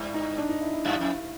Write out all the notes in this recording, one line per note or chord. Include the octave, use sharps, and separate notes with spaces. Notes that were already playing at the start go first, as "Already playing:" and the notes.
Already playing: G2 E4
D#4
D4
D#4
E4
E4
F#2 E4
F2